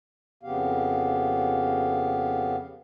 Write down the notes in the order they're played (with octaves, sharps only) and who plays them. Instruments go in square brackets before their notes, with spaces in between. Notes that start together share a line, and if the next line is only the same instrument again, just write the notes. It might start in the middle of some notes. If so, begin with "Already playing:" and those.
[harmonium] F2 C#3 B3 G4 F5